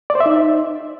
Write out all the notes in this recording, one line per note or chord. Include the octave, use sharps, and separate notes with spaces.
D5
C5
E5
D#4